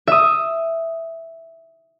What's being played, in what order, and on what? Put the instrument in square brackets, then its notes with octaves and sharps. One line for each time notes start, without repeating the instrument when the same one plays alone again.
[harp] E5 D#6